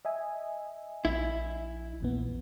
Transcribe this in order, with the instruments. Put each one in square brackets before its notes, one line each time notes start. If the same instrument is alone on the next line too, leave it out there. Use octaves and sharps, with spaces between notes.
[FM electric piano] D#5 E5 G#5
[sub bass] A#1 [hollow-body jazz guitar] E4
[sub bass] A#1 [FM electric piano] E2 A#2 B3